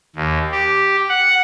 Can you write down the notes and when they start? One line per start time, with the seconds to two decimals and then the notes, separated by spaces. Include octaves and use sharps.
0.16 D#2
0.51 G4
1.09 F#5